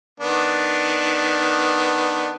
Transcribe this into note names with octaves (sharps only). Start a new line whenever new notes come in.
D#3 B3 D4